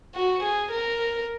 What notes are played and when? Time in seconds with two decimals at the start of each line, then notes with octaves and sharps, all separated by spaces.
0.15 F#4
0.43 G#4
0.71 A#4